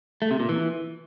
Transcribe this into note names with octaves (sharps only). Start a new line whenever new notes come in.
A3
C3
A#2
E3